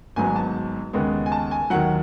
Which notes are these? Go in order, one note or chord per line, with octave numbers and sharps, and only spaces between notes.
G#1 G#2 F#3 B3 G#5
A5
D#2 C#3 G#3 B3
G#5
A5
G#5
D#2 D#3 F#3 F#5